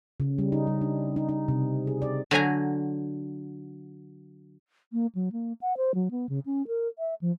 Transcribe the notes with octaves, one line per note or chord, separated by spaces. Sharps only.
C#3
G3
D#4
G3
D4
D#4
D#4
C3
G#4
D5
D3 F#3 G#5 A#5
A#3
F#3
A#3
F#5
C5
F#3
B3
C#3
C#4
A#4
E5
F3